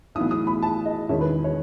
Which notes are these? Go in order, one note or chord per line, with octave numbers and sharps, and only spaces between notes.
B1 A2 E3 B3 D#6
D#6
B5
A5
D#5
E1 E2 D#3 G#3 C#4 E5
B4
C#5